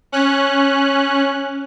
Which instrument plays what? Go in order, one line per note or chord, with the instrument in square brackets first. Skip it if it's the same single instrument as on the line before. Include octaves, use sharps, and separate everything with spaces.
[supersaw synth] C#4 F#6